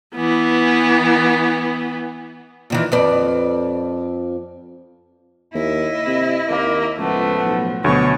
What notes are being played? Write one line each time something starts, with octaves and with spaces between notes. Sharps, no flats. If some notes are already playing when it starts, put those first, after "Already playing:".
E3 B3
A#2 D#3 E3
F2 B4 D5
D#2 E4 D#5
C3
D#2 A#3
C#2 A2 F3 A3 B3
B1
D2 B2 F#3 C#5